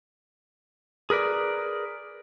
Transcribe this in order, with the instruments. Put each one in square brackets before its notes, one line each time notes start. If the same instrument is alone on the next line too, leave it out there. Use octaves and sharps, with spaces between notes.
[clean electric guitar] G#4 A#4 B4 D5